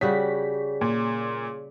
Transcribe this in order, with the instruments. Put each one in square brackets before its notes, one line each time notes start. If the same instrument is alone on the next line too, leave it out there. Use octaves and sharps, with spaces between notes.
[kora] C#3 G3 F#4 [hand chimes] G#4 C#5 [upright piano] B6
[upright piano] A#2